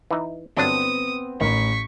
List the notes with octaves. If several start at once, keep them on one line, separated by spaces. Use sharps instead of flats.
E3 D#4
G1 F#3 B3 C4 D4 D#6
A1 D#3 C#6 B6